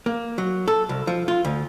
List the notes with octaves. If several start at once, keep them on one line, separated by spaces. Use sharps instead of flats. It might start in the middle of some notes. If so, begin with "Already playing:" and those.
A#3
F#3
A4
C2
F3
F4
D2